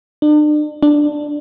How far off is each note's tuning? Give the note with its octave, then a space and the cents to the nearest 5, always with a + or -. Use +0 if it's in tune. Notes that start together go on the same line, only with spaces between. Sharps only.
D4 +40
D4 +5